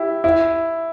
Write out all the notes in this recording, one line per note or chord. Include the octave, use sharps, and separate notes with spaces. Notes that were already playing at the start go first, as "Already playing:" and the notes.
Already playing: E4 G4
E4